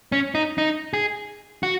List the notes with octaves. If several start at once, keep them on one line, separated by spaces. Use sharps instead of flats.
C#4
D#4
D#4
G#4
F#4